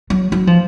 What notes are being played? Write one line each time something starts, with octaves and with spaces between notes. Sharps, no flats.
F#3
F#3
F3